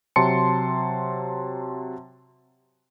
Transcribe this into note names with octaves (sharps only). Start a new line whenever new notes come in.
C3 F#3 A5 C6 C#7